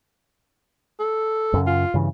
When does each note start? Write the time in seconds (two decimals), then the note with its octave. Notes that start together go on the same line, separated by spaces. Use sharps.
1.00 A4
1.53 F#2 C#3
1.67 F4
1.94 G2 C#3 E3